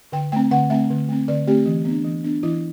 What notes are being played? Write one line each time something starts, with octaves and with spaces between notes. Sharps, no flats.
D3 G5
A3 C4 G5
D3 F#5
A3 C4 E5
D3
A3 C4
D3 D5
A3 C4 G4
E3
B3 D4
E3
B3 D4
E3 E4